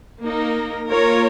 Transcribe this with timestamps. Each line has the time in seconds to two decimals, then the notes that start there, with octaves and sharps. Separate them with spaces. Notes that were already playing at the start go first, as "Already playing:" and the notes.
0.25 A#3 D#4 A#4
0.88 A#3 F4 A#4 C#5